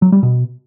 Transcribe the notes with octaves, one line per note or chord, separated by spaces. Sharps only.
F#3
G3
B2